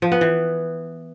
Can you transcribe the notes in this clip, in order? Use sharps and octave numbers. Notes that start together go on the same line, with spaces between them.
F3
B3
E3